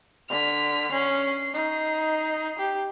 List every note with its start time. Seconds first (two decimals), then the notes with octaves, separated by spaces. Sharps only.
0.29 D3 F6 B6
0.92 C#4 C7
1.54 D#4
2.59 G4